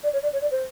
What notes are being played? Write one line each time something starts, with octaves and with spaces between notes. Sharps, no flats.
D5
C#5
D5
C#5
D5
C5